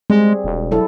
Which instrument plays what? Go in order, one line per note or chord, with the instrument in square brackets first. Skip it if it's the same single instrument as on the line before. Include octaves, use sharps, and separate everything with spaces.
[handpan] G3 C4 G#4 [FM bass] G#3
[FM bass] E1
[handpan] F#3 E4 A4